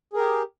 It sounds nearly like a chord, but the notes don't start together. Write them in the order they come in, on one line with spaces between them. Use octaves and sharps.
G#4 A#4 G4